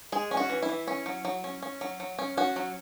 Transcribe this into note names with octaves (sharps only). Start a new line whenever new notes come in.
G#3 G#4
C#4
F#4
E3
E4
E3
C#4
F#3
F#3
C#4
C#4
F#3
F#3
C#4
C#4 F#4
F#3